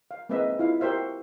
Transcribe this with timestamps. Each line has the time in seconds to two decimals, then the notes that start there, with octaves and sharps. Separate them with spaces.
0.11 F5
0.29 G#3 A#3 C4 B4 D#5 E5
0.59 E4 F4 F5
0.80 F#4 G4 A#4 C5 E5 F5